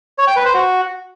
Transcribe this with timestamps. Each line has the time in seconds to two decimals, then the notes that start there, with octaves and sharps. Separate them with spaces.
0.18 C#5
0.27 G5
0.36 B4
0.45 C5
0.54 F#4